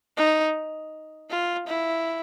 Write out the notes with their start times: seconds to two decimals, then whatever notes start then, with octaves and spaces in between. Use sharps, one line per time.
0.17 D#4
1.30 F4
1.68 E4